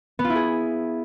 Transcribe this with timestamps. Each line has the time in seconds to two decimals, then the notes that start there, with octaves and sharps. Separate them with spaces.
0.19 B3
0.24 F4
0.30 E4
0.35 G#4